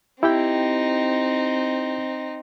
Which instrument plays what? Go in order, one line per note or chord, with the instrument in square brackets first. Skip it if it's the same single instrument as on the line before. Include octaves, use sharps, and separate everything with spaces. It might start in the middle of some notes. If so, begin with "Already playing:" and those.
[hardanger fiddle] C4 D#4 [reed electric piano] E4 G4 G5